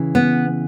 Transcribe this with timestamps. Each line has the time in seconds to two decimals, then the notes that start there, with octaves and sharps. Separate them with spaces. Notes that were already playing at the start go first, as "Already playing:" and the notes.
Already playing: C#3 E3
0.15 B3